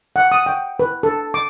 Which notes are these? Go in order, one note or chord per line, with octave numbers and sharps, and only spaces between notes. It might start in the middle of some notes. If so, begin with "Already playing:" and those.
F#5
D#6
G5
B4
A4
D6